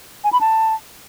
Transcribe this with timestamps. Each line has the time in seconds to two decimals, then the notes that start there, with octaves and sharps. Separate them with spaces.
0.24 G#5
0.32 B5
0.41 A5